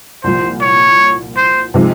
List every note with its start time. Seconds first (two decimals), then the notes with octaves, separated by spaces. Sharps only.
0.24 C2 A#2 F3 C5
0.61 C#5
1.37 C5
1.74 C3 F3 G#3 D#4 G#4